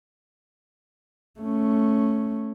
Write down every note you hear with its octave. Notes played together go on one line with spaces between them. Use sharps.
A3 C#4